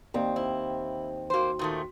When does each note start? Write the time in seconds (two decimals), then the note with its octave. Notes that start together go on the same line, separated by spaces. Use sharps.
0.14 D#2 C4 D5
0.36 E4 C5
1.30 A#3 F#4 C5 C6
1.59 A#2 D#3 A3